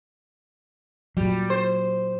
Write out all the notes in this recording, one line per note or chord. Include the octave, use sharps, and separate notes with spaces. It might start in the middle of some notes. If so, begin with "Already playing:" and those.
A#2 F#3 G3
C5